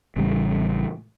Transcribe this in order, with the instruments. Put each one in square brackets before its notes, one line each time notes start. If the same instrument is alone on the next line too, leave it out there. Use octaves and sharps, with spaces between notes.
[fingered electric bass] A1 C#3 G3 A3